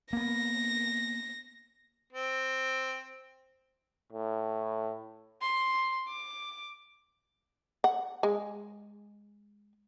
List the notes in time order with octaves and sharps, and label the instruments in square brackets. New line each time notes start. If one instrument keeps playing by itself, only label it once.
[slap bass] A#3 B3 [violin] A#6
[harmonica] C4
[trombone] A2
[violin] C6
D6
[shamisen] F#5
G#3